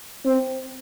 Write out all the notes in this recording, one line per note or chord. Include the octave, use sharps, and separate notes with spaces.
C4